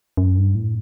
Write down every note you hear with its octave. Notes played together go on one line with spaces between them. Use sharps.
F#2
G2
A2